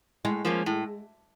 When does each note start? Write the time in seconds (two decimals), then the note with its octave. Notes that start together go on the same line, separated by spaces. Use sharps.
0.25 A2 G#3
0.45 F3 A#3 C#4
0.66 A2